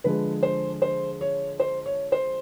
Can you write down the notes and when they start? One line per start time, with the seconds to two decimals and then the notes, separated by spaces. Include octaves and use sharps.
0.04 D3 F3 G#3 B4
0.43 C5
0.82 C5
1.21 C#5
1.60 C5
1.86 C#5
2.12 C5